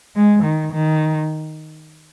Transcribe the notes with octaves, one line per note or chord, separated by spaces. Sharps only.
G#3
D#3
D#3